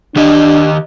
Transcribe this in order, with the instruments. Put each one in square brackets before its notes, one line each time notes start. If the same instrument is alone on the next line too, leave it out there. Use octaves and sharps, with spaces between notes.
[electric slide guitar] D#3 G4 D#5 [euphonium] D4